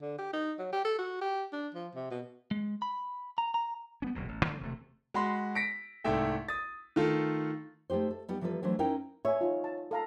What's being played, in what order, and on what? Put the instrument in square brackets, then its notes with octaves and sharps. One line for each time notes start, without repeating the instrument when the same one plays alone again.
[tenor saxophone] D3
G4
D#4
F#3
G4
A4
F#4
G4
D4
F3
C3
B2
[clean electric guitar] G#3
B5
A#5
A#5
[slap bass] G3 B3 C#4
E1 C2 A#2
A1
D3 E3 G3 A3
E1 C3 A3
[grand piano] G#3 F#4 B5 C6
A#6 B6 C#7 D7
C2 G#2 A3 E5 G5
D#6 A6
D#3 A3 F4 A4
[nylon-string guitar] G#3 A3 D#4 G4 C5
A4
G3 B3 D#4 G4
E3 F3 G3 A#3 A4 B4
E3 F#3 A3 D4 C5
C#4 D#4 E4 A#4 F5 G5
[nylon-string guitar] C#5 [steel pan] E5 G#5
[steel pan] D#4 F4
A5
A4 F5 A#5